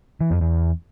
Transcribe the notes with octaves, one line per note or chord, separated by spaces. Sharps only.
E3
F2
E2